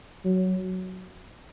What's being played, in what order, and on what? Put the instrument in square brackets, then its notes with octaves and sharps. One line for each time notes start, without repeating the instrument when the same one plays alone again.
[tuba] F#3